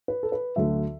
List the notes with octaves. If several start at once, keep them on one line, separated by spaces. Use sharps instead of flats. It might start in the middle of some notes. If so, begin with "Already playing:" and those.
B4
A4
B4
D2 D3 F#3 E5